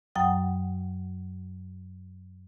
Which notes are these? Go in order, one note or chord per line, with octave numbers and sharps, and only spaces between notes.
F#2 F#3 F#5 G5 D#6